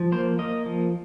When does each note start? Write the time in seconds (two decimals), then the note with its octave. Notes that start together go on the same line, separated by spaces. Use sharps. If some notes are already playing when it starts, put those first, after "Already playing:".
Already playing: F3
0.12 A#3 C5
0.39 A#3 D#5
0.66 F3